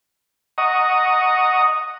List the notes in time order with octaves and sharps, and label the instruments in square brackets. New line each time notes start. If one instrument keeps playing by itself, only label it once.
[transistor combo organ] D#5 F#5 A#5 C#6 D#6